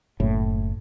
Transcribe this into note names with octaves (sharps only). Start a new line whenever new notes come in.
F#1 A2